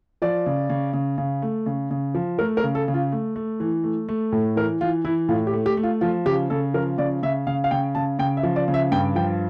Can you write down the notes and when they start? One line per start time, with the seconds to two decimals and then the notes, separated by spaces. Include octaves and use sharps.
0.22 F3 D5
0.46 C#3
0.70 C#3
0.93 C#3
1.18 C#3
1.42 A3
1.66 C#3
1.91 C#3
2.15 F3
2.39 A3 A#4
2.57 A#4
2.63 C#3
2.75 A4
2.88 C#3
2.94 F4
3.12 A3
3.36 A3
3.60 E3
3.84 A3
4.09 A3
4.32 A2
4.56 E3 A#4
4.81 E3 F4
5.05 E3 E4
5.29 A2 F4
5.47 G4
5.54 A3
5.66 G4
5.77 A3
5.83 F4
6.01 F3 F4
6.26 C#3 G4
6.50 C#3 A4
6.74 F3 A#4
6.98 C#3 D5
7.23 C#3 E5
7.47 C#3 F5
7.64 F5
7.71 C#3 G5
7.95 C#3 A5
8.19 C#3 G5
8.37 E5
8.43 F3
8.56 D5
8.68 C#3
8.74 E5
8.92 G2 G5
9.15 F3 G5